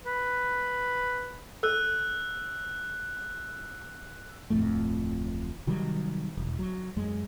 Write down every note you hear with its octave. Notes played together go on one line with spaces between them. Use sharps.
B4
A4 E6 F#6
D1 F2 A2 A3
C3 D#3 F#3 G3
E1
F#3
F#2 G#3